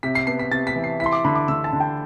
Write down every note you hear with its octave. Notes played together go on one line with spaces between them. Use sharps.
C3 B6
C7
B3 C7
B6
C3 A6
B6
E3
C7
E4 B6
C6
D6
D3 B5
D6
D3 E6
A5
D3
G5